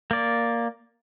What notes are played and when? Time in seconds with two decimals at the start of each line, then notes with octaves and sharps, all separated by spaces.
0.11 A#3 D5